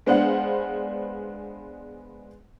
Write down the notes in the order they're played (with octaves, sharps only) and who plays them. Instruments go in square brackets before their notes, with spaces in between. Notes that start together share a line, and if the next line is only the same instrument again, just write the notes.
[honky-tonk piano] G#3 B3 D4 C5 F5 F#5